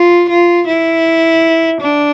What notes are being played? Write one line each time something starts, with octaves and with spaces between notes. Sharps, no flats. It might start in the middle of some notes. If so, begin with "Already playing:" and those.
Already playing: F4
F4
E4
D4